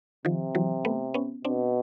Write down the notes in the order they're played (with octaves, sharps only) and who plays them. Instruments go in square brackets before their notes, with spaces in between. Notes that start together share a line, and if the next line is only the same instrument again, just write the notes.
[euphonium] C3 [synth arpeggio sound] D#3 F3
[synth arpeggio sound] E3 F#3
A3 B3
B3 C#4
[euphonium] B2 [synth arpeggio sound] C4 D4